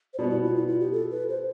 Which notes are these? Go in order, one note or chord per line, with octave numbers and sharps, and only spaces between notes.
C5
B2 G3 B3 D5
E4
F4
E4
F4
G4
A4
B4
C5